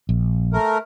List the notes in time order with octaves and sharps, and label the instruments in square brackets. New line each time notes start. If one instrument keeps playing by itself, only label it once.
[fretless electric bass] A#1
[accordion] A3 A#4